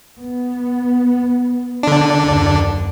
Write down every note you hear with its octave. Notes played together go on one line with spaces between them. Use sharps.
B3
D3 D4
F#1 D#2